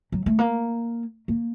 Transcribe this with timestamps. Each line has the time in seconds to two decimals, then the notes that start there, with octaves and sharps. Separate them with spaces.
0.12 F#3
0.26 A3
0.39 A#3
1.28 A#3